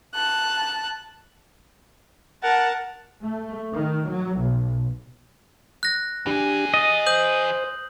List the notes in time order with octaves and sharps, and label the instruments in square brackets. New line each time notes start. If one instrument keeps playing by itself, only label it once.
[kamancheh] A5 F#6
[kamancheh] A#4 A5 [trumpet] F#5
[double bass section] A3
D#3
F#3
B1
[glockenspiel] F#6 A#6
[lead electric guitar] E3 G#4 [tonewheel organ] D4 G4
[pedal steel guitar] D#5 [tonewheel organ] A6
[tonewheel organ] C5 [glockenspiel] D#6 G6 F#7